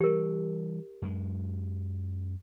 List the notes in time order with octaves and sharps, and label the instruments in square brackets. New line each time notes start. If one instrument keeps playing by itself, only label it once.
[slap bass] E3 G3 [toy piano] G4 A#4
[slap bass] F#2 G#3